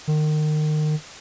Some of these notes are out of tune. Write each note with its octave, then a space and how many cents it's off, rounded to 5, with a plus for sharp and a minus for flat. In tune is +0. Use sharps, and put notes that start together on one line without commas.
D#3 -30